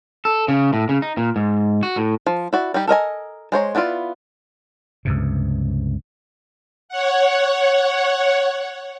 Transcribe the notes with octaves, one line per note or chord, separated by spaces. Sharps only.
A4
C#3
A2
C#3
D#4
A#2
G#2
F#4
A2
F3
E4 F#4 D5
G3 D#4 G4
A4 A#4 D#5 G#5
G#3 C5 C#5 A#5
B3 D4 E4 F4 D5
C#2 G2 C3
C#5 F#5